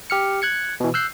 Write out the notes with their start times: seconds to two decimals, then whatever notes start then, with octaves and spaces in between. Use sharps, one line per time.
0.10 G4 F6 C#7
0.42 F#6 G#6 C#7
0.80 B2 E3
0.94 E6 F#6 G6 C7